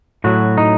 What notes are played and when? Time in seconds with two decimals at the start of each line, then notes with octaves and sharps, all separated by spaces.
0.24 A2 F#3 F#4
0.58 D#4